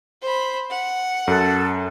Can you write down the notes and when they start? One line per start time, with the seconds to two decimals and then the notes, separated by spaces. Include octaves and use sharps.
0.22 C5 B5
0.71 F#5
1.28 F#2 A4 F#6